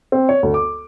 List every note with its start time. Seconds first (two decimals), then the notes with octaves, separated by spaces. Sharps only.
0.12 C4
0.29 C#5
0.43 D2
0.54 D6